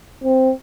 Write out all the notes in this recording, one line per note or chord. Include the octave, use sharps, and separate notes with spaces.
C4